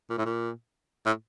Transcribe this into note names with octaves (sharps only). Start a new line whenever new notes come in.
A#2
A2
A#2
A2